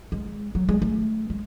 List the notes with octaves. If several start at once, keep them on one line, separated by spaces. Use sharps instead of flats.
G#3
F#3
G#3
A3
G#3